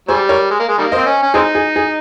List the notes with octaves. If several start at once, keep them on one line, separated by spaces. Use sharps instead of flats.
G3 G#4 C5
A#4 C#5
G#3
A#3
G#3
D#3 G3 A#3
C4 C5 D#5
C#4
C#4
G#3 C4 D#4 G#4 C5
G#4
G#4